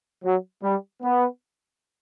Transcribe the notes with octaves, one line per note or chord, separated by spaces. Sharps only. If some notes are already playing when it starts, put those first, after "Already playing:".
F#3
G3
B3